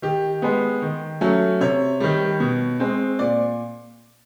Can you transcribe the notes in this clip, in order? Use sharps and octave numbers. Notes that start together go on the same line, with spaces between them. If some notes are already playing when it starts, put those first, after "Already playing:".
D#3 G4
G#3 B3
D#3
F#3 A3 C#4
C3 C#5
D#3 G3
B2
G#3 C4
A#2 D5